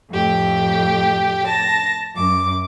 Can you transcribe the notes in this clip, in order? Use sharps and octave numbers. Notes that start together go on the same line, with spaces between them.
F2 A2 G4 G5
A5 A#6
F#2 D6